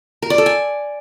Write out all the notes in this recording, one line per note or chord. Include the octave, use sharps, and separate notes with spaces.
A#4
D5
A4
G#5